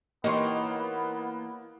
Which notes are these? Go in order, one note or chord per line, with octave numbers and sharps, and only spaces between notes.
E3 A#3 B3 D#4 G4 C#5 D#5 C6